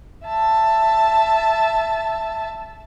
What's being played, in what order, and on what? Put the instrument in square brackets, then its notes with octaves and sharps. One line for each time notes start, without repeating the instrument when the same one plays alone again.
[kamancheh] E5 A5